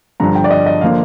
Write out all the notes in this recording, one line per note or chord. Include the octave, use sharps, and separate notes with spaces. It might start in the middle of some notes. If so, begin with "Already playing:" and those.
G2 D3 F3 A#5
G5
D5
D#5
D#5
D3 F3 A#3 F5